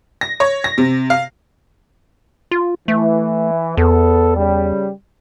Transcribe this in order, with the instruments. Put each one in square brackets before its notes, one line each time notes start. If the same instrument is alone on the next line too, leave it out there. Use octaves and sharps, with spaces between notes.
[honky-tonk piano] A#6
C#5
A#6
C3
F5
[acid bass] F4
[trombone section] E3 [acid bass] A3
[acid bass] E2 [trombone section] B3 A4
[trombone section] C#3 G3